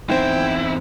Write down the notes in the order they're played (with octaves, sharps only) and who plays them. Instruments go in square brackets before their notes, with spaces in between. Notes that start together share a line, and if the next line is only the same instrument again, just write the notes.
[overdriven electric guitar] E2 C4 [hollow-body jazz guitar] D#4 C5 [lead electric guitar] E4 [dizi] G5